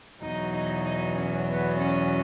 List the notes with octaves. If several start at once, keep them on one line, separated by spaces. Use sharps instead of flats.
E2 B2 F#3 D#4
D#4
D#4
C#4
B3
C#4